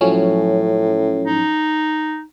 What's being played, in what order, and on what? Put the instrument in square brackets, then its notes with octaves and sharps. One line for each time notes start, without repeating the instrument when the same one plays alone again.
[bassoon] A2 [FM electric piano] F3 F#3 C#4
[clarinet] D#4